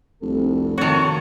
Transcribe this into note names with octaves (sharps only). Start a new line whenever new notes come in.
F1 C2 D3 A4
D#3 A#3 F#4 C#5 A5